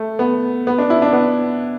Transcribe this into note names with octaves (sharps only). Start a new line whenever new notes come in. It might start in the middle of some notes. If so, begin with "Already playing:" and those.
Already playing: A3
B3
B3
D4
E4
D4
B3